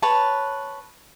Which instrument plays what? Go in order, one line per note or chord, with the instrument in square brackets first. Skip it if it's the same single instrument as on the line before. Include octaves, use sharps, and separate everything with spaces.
[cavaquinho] B4 C#5 A5